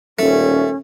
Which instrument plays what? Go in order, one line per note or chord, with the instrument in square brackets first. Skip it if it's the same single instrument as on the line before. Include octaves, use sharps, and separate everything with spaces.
[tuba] D#1 [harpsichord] A3 [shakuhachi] C#4